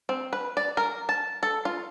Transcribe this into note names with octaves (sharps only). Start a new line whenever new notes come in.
C4
B4
D5
A#4
A5
A4
F4